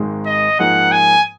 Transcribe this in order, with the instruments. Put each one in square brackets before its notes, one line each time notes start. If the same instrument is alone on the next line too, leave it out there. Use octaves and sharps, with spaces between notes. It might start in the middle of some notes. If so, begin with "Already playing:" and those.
Already playing: [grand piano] G#1 G#2 D#3 G#3
[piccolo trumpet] D#5
[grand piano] G#2 F3 A#3 D#4 G#4 [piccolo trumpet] F#5
[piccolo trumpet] G#5